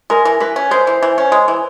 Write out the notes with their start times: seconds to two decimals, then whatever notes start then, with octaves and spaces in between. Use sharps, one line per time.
0.10 G#3 A#4
0.25 E3
0.40 E3 B4
0.56 C#4
0.71 G#3 C5
0.87 E3
1.03 E3
1.18 C#4
1.32 G#3
1.48 E3